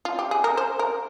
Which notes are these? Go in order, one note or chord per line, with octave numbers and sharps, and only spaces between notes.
F4
G4
G#4
A#4
C5
A#4